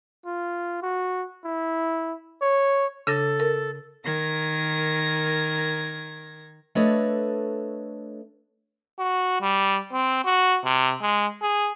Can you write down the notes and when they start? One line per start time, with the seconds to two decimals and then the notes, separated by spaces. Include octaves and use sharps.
0.26 F4
0.82 F#4
1.45 E4
2.42 C#5
3.07 C#3 D4 A4 A#6
3.40 A#4
4.05 D#3 A#4 G#6 A#6
6.75 A3 D4 A4 B4 C#5 D#5
8.99 F#4
9.41 G3
9.93 C4
10.25 F#4
10.64 C3
11.01 G#3
11.42 G#4